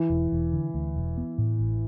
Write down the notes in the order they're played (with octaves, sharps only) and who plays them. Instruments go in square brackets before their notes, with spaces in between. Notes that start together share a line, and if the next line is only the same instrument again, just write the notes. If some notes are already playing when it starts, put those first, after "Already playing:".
Already playing: [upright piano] E3
[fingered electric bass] E1
E1
D3
D2
E1
B3
A2
A1